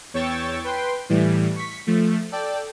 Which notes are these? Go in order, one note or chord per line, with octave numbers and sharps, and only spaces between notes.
E2 C#5 G5 C#6 E6 A6
B4 G5 C6
A2 E3 G3
C#6 B6
F3 A3
A4 D5 G5